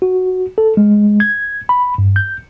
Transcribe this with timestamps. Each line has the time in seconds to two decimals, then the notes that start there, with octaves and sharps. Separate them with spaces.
0.02 F#4
0.58 A4
0.77 G#3
1.20 G#6
1.69 B5
1.98 G2
2.16 G6